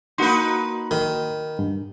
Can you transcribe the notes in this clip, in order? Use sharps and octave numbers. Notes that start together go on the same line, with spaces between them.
A#3 D#4 F#4 B4 C6
D#3
G2